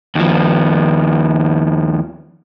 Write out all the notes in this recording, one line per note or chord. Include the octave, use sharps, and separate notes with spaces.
D#2 F3